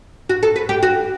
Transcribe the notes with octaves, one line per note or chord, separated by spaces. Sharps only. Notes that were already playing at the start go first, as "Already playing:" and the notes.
F#4
A4
B4
G4
F#4